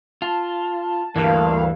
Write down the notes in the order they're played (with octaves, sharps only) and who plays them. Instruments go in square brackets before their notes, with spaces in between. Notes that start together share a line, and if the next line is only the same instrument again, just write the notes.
[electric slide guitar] F4 [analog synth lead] A5
[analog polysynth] D2 G2 [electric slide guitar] E3 [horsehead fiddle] A#3 F5